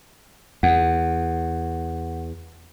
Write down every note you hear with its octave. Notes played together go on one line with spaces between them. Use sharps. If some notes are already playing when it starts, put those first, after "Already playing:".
E2 F#5